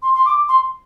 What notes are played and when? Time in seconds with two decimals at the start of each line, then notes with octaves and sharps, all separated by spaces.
0.02 C6
0.15 C6
0.25 D6
0.49 C6